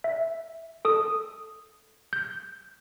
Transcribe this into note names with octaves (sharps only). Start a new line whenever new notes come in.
E5
A4 D#6
G6